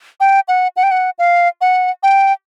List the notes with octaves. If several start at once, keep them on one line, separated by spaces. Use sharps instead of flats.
G5
F#5
F#5
G5
F#5
F5
F#5
G5